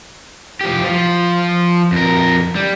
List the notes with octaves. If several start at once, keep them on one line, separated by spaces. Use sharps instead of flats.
F3 G4
F3 F4
F2 A#4
G3